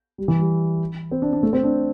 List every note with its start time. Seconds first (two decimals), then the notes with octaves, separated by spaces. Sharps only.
0.18 G3
0.28 E3
0.39 G3
1.11 C4
1.22 D4
1.33 D4
1.43 A3
1.53 C4
1.63 D4